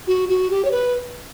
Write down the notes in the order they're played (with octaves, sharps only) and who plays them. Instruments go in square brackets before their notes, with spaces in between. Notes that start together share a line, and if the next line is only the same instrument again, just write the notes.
[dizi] F#4
F#4
G4
C#5
B4